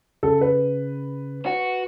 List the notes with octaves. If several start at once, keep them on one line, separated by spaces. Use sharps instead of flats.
C#3 A4
B4
F#4